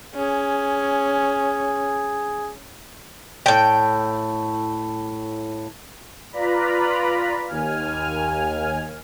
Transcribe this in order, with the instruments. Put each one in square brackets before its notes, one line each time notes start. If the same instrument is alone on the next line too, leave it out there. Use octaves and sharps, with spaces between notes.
[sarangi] C#4 [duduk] G#4
[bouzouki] A2 G5
[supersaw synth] F4 B4 D5 A#5 B5
D#2 G#5 F6